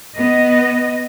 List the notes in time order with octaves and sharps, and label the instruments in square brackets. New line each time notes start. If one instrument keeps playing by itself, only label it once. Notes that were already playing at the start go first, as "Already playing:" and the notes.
[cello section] B3 D#5